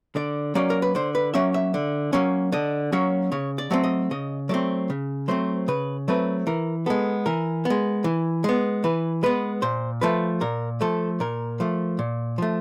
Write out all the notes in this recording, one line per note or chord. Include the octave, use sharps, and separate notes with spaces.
D3 D5
F#3 A#3 C#4 D5
A#4
B4
D3 C5
B4
F#3 A#3 C#4 E5
E5
D3
F#3 A#3 C#4
D3 D#5
F#3 A#3 C#4 C#5
C#3 C#5
D5
F#3 A3 C4
D#5
C#3 D#5
F#3 A3 C4 D5
C#3
F#3 A3 C4 C5
C#3 B4
F#3 A3 C4 B4
E3 A#4
G#3 B3 A4
E3 A#4
B3
G#3
E3
G#3 B3
E3 B4
G#3 B3 B4
A#2 C5
F3 A3 B4
A#2 A#4
F3 A3 A4
A#2 A#4
F3 A3
A#2
F3 A3